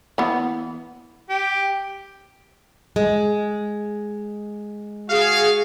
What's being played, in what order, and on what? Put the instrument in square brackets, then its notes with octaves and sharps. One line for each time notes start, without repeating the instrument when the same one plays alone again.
[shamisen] E3 B3
[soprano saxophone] G4
[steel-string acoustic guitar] G#3
[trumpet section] F#4 F5 [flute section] G#4